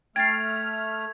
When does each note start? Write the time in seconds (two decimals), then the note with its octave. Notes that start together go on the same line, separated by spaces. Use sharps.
0.16 A3 G5 F6 G#6 A6 C7